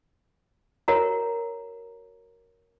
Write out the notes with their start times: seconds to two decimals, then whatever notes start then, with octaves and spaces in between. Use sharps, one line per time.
0.88 F#4 A#4 C#5 A#5